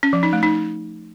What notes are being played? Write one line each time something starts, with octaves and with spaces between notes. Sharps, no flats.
C#4
F3
D#4
A3
D#4